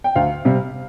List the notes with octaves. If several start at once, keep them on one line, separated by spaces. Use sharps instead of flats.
G5
D2 F5
C3 G3